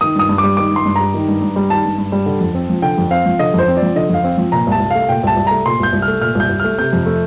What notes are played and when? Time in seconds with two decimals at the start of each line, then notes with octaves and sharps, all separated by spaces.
0.01 D#3 D#6
0.15 G2 D#6
0.29 G2
0.38 D6
0.43 G3
0.57 D#3 D6
0.71 G2
0.76 C6
0.86 G2
0.96 G3 A#5
1.14 D#3
1.28 G2
1.41 G2
1.56 G3
1.70 D#3 A5
1.85 G2
1.98 G2
2.12 G3
2.26 D3
2.40 F2
2.55 C4
2.69 F3
2.82 D3 G5
2.98 F2
3.11 C4 F5
3.26 F3
3.39 D3 D#5
3.54 F2 C5
3.68 C4
3.77 D5
3.82 F3
3.96 D3 D#5
4.09 F2 F5
4.24 C4
4.38 F3
4.52 A#2 A#5
4.67 C2
4.72 A5
4.80 C2
4.91 A3 F5
5.09 A#2 G5
5.23 C2 A5
5.37 C2
5.47 A3 A#5
5.66 A#2 C6
5.80 C2 G6
5.93 C2
6.02 F6
6.08 A3
6.21 A#2 F6
6.35 C2 G6
6.49 C2
6.60 A3 F6
6.78 C3 G6
6.93 F2
7.06 A3